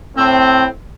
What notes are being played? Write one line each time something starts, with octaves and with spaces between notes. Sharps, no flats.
A2 C4